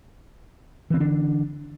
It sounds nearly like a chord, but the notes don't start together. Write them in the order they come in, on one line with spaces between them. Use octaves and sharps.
E3 C4 D3 D4